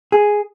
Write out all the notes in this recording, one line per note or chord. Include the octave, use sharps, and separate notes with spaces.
G#4